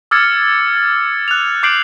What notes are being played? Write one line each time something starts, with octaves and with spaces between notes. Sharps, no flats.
D6 E6 F6 G#6 A6 C#7
F#6 F7
D6 G6 C7 D7 F#7